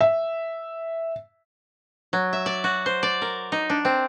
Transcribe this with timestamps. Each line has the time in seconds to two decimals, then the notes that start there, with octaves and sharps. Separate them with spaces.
0.01 E5
2.13 F#3
2.33 E5
2.46 D5
2.64 F#4
2.86 C5
3.03 D5
3.22 A#4
3.52 D#4
3.70 D4
3.85 C4